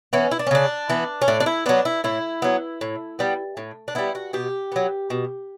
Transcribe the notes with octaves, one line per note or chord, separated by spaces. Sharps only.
E3 B3 C#4
E4
D4
C#4
C#3 D4
E3 B3
C#4
A2 D4
D4
E4
F#3 B3 D4
E4
A2 E4
F#3 B3
A2
G3 B3
A2
D4
G3 B3 E4
F#4
B2 G4
F#3 B3
B2